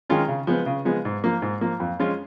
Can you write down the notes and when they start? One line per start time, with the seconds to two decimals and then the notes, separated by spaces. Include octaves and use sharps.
0.09 D#3 G#3 C#4 F4
0.28 C#3
0.47 F3 G#3 B3
0.66 C#3
0.85 F3 G#3 B3
1.05 G#2
1.24 F3 A#3
1.42 G#2
1.61 F3 A#3
1.80 F2
1.99 F3 G#3 C#4 F4